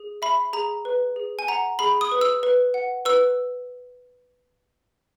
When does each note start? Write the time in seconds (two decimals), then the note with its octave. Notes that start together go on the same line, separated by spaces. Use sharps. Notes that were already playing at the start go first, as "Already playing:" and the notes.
Already playing: G#4
0.22 E5 B5
0.53 G#4 A#5
0.85 B4
1.16 G#4
1.39 G#5
1.48 F#5 A#5
1.79 G#4 B5
2.01 D#6
2.12 B4
2.21 E6
2.43 B4
2.74 F#5
3.05 B4 E6